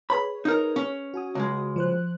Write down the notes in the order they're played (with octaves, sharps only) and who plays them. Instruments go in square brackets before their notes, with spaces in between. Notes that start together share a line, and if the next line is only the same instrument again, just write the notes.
[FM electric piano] G#4 B4 C#5 [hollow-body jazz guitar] B5
[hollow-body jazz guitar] D#4 A#4
C#4
[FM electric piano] F#4 G#5 D#6
[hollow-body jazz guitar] C#2 G#3
[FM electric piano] F3 C5 F#6